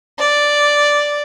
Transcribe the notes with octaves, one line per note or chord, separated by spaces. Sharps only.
D5